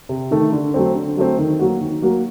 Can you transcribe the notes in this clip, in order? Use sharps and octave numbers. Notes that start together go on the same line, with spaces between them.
C3
D#3 A3
D3
F#3 A3 C4
D3
F#3 A3 C4
D#3
F#3 A#3 F#4
D#3
F#3 A#3 F#4